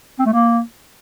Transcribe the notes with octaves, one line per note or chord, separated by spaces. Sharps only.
C4
A3
A#3